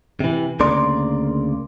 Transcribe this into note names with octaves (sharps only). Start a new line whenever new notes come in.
C3 E3
D2 C#3 A#3 D5 C6